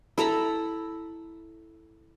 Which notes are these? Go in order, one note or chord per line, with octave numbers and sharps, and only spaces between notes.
E4 A4 A#5 B5